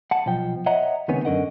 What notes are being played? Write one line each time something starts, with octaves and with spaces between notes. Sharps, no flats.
F#5 A5
B1 F3 G5
C#5 D#5 E5 F#5 A#5
C#2 C3 D#3 B3 C#4
F#2 D3 C#4 A#4 D#5 F#5